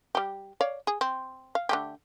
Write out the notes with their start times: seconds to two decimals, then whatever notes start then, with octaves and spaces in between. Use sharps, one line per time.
0.15 G3 G4
0.61 C#5 D5 F5
0.87 G#4
1.01 C4
1.55 F5
1.69 D3 A3 G4